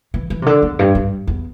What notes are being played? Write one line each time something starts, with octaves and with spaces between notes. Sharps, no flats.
E3
E3
C3
D3
E2
G2
G2
E2